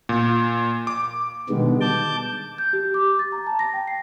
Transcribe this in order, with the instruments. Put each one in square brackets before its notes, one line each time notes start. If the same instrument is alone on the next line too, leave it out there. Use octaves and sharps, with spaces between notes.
[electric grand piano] A#2
D6
[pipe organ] B2 D3 D#3 G3 G#3 B3
A5 D6 G6
[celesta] G6
G4
D6
A6
A#5
A5
A#6
G5
C7